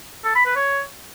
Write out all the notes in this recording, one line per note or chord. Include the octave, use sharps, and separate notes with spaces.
A4
B5
B4
C#5